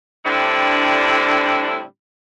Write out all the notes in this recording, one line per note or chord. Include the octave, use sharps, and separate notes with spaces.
A2 D3 G3 C4 D4 E4